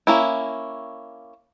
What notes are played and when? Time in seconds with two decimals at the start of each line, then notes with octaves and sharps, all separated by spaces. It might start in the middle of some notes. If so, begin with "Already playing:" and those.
0.07 A#3 C#4 E4